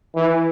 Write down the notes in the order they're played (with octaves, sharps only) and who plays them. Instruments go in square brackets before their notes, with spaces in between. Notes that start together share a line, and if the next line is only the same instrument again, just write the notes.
[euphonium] E3